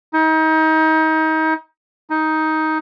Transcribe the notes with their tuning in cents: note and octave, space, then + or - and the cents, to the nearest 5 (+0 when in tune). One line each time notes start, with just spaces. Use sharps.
D#4 +30
D#4 +10